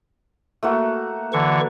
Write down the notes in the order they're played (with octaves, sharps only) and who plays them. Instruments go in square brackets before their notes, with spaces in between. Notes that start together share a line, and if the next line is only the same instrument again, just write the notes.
[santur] A3 A#3 F#4
[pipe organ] D3 E3 C#6